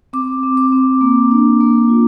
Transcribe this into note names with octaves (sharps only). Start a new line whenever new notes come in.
C4 D6
C4
D6
C4
A#3
D4
A#3
F4